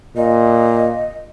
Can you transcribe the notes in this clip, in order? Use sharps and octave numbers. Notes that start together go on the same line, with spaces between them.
A#2 D#5